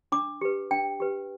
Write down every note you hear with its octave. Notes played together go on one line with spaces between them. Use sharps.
D4 D6
G4 B4
D4 G5
G4 B4